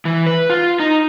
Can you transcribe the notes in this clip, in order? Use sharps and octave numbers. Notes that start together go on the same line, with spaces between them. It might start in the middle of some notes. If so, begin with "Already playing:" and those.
E3
B4
F4
D#4